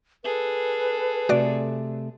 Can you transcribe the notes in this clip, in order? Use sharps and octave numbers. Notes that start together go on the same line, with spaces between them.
G#4 A4 B4
C3 A3 F#4 D5